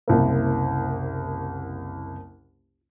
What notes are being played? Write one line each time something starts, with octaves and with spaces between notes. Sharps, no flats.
F#1 C2 A#3